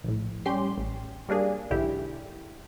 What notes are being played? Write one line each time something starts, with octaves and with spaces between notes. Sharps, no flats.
A#1 A2
G3 C#4 G4 C6
A1
G3 A#3 D4 G#4
B1 G#2 D3 E4 G4